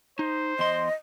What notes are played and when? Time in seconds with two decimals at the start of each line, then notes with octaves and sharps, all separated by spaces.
0.19 D#4 C5
0.59 E2 D#5 C6